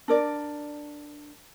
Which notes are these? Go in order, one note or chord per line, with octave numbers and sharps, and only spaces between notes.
D4 A#4 D5